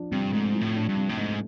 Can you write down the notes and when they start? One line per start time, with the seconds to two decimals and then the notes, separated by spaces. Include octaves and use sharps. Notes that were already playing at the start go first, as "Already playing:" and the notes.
Already playing: F3 D4
0.11 G2 C3
0.32 G#2 A3
0.55 F3
0.61 A2
0.75 D4
0.89 G2
0.96 C3
1.10 A2
1.18 G#2 A3